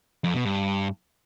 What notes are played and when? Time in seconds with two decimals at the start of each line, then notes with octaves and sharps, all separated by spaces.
0.24 F2
0.34 B2
0.45 G2